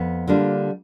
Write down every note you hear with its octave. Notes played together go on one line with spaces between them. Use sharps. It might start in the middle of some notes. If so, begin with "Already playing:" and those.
Already playing: F2 B3
D3 G3 A#3 D4 F4